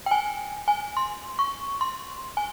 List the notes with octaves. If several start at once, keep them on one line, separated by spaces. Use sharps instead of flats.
G5
G#5
G#5
C6
C#6
C6
G#5